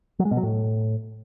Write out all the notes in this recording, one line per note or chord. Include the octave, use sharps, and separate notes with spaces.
F#3
G#3
B2
F#3
A2